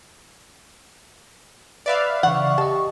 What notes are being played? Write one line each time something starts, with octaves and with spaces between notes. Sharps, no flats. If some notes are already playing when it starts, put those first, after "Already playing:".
B4 D5 E5 F5
C#3 E3 F#5 C#6
G4 D#5 A5